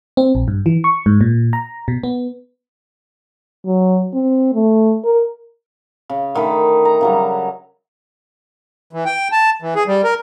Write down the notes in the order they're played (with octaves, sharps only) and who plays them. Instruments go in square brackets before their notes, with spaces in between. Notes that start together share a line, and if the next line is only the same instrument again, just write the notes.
[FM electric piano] C4
A#1
G2
E3
C#6
G#2
A#2
A#5
B2
B3
[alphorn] F#3
C4
A3
A#4
[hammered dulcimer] C#3
D3 D#3 A3 B5
A#5
C#3 F#3 G3
[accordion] E3
G5
A5
E3
G#4
G3
A#4